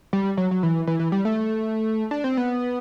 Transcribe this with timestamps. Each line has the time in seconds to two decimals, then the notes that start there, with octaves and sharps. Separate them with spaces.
0.13 G3
0.37 F#3
0.51 F#3
0.63 E3
0.87 E3
0.99 E3
1.12 G3
1.25 A3
2.11 D4
2.24 C4
2.37 B3